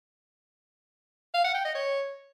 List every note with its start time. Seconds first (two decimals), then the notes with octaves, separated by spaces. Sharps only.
1.34 F5
1.44 F#5
1.55 G5
1.65 D#5
1.75 C#5